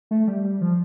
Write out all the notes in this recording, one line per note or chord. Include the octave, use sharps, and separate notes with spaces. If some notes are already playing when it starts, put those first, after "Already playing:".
A3
G3
G3
F3